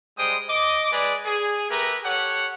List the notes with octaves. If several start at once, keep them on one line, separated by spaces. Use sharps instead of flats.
G3 G#3 C5 G5 D#6
D#5 D6
G#3 G#4 B4 D5
G#4
A3 G4 A#4 B4 A#5
G4 A4 C#5 F#5